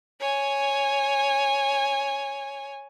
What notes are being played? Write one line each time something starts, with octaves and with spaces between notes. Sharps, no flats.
C#5 G#5